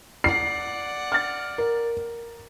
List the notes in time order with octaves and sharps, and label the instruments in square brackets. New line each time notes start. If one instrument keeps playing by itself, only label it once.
[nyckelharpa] D5 F#5 [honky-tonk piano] C7
[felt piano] F6 A6
A#4